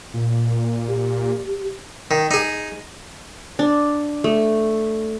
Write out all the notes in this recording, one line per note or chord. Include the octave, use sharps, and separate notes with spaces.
A#2
G4
D#3
D#4 G#4
D4
A3